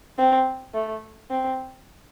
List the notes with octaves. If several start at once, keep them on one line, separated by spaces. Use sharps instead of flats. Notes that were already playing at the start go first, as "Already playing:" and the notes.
C4
A3
C4